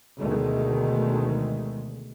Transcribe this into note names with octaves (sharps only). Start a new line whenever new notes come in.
D2 B2 D#3 G#3 A3